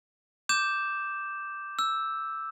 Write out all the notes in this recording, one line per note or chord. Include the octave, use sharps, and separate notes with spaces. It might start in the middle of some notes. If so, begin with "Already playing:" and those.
D6 G6 E7
E6